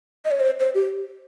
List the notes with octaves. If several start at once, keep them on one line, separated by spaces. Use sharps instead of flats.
D#5
C#5
C5
C5
G4